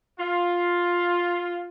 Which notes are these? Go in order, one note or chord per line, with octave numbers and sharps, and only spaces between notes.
F4